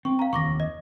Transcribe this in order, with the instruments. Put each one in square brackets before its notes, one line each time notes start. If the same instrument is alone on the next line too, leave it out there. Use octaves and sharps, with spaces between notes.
[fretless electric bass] C4 [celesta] C#6
[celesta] F5 A#5
[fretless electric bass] F1 D#2 [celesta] C#6 D6 A#6
[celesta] D#5